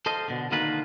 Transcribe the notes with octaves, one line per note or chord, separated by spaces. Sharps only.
A4 C5 D#5 F5
B2 D3
D3 D#3 A#3 D#4 F4 B4